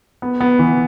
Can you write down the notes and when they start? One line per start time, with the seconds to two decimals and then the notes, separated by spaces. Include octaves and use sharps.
0.22 B3
0.41 B3
0.59 E3